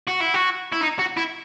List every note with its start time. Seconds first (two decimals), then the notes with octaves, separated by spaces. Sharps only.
0.08 F#4
0.21 E4
0.34 F#4
0.72 E4
0.81 D#4
0.99 F#4
1.17 E4